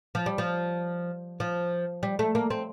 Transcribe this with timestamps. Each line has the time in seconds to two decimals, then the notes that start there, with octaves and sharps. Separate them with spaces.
0.15 F3
0.26 G3
0.38 F3
1.40 F3
2.03 G3
2.19 A3
2.35 A#3
2.50 C4